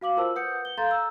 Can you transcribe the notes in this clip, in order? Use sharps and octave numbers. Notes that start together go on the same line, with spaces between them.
F#4 F5 D6 F#7
F4 A#4 C5 A5 E6
B4 F#5 D#6 G6 C#7
G7
A4 F5 A#5 C6 G6 A6
A#5 E6